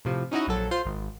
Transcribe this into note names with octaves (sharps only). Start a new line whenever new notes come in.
A2 C3 F3
C#4 D#4 E4 F#4 D#5
A#1 F#3 A4
F4 C5 C6
G#1